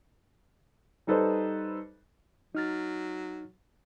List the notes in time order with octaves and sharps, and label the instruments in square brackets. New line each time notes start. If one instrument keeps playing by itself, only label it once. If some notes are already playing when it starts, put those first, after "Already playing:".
[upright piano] G3 D#4 A4 B4 C5
[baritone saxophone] F#3 [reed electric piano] D#4 F6 A6